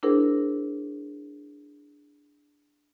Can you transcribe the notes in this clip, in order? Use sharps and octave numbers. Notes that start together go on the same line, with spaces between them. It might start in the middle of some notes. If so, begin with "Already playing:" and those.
D4 E4 G#4 A#4 C5